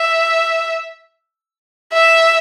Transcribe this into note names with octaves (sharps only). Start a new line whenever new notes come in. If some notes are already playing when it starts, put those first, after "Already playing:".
Already playing: E5
E5